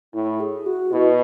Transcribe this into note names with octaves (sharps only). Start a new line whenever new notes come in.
A2 E4
G#4
F#4
B2 E4